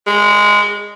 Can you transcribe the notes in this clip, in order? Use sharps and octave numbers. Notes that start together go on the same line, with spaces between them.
G#3